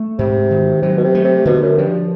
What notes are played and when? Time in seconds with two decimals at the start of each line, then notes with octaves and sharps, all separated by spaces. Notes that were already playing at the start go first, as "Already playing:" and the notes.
Already playing: A3
0.18 G#2 C3
0.51 D#3
0.82 C3 F#3
0.97 B2
1.04 C3
1.15 A3
1.24 C3
1.45 B2 D3
1.62 F#2
1.78 G2 F3